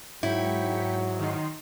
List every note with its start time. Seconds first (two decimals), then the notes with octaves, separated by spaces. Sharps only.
0.23 G#2 F#3 E4 G5 B6 C#7
1.18 D#3 D#4 C6